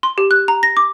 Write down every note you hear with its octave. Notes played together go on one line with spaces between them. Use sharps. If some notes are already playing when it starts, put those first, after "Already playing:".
C6
G4
F#6
A#5
A#6
D6